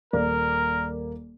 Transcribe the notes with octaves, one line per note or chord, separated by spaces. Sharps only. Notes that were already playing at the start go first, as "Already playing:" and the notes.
D#1 A#3 A#4 D5